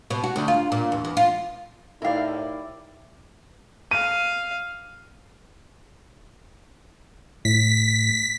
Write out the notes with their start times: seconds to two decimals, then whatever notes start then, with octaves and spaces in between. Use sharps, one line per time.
0.10 B2
0.24 F#4
0.36 D2
0.48 F4
0.72 A#2
0.92 E2
1.05 E2
1.17 F4
2.02 A2 D#4 E4 G4 A#4 D5 F5
3.91 F5 D#7
7.45 A2 B6